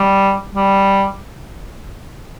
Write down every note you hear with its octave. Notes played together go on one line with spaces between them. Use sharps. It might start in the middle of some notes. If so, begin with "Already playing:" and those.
Already playing: G3
G3